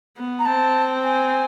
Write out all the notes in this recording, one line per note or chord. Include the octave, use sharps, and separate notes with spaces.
B3
A#5
C4 A5
G#5